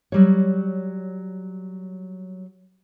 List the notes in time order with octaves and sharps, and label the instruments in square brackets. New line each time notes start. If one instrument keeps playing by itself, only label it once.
[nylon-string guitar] F#3 G3 C#5